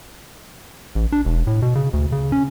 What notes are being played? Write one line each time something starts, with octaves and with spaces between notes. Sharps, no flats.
A1
D4
E1
A2
B2
C#3
D2
C#3
C#4